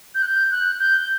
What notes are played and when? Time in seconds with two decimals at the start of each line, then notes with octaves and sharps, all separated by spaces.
0.15 G6
0.22 F#6
0.28 G6
0.51 F#6
0.80 G6